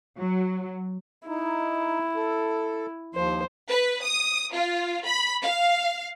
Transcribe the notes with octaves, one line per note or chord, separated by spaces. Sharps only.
F#3
D#4 E4
A4
D#2 F3 C5
B4
D#6
F4
B5
F5